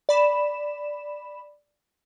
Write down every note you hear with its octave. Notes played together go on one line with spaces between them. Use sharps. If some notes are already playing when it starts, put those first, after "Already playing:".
D5 B5 E7